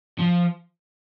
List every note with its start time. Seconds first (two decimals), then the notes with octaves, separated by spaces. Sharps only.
0.19 F3